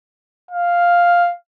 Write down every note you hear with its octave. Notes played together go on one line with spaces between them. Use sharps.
F5